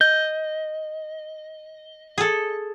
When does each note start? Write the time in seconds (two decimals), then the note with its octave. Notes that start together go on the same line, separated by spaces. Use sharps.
0.01 D#5 G6
2.18 G#4 A4